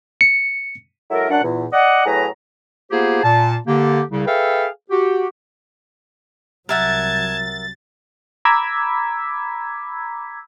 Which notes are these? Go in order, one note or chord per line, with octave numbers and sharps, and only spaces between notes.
C#7
F#3 G#3 E4 A4 A#4
F#2 D4 F#5
E2 A#2
D5 D#5 F#5
A2 F#3 G#4 B4 A#5
A#3 B3 F4 G4 G#4 C5
A#2 A5
D3 A#3 G4
C2 C#3
G#4 A4 B4 E5 F5 G5
F#4 G4
C2 F#3 A#4 E5 F#5 A5 G#6 A6
A#5 B5 D6 E6 G#6 B6